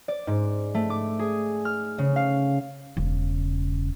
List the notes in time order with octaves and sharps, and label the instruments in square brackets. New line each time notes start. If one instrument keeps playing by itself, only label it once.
[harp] D5
G#2
A3
D6
G#4
F6
C#3
F5
[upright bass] E1 C#3